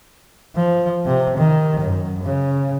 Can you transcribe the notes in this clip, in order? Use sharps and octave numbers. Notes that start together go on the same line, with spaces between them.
F3
C3
D#3
F#2
C#3